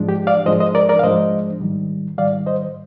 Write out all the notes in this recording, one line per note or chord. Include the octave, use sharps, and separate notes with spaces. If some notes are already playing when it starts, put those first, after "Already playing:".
Already playing: G#2 F3 G#3 D4
G4
D5 F5
G#2 F3 G#3 D4 C5 D#5
C5 D#5
A#4 D5
A#4 D5
F5
G#2 F3 G#3 D4 C5 D#5
G#2 D#3 G3
G#2 D#3 G3 D5 F5
C5 D#5